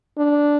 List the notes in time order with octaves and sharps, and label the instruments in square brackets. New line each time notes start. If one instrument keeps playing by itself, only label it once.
[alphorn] D4